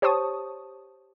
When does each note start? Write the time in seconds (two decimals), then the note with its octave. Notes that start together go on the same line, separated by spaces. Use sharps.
0.02 G4 C5 C#5 A5 C#6 D#6